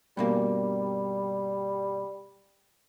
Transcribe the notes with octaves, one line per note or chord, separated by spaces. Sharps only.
G2 B2 G3 A#3